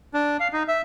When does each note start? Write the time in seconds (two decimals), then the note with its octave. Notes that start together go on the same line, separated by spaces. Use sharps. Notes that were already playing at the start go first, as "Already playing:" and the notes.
0.14 D4
0.40 F5
0.53 D#4
0.68 E5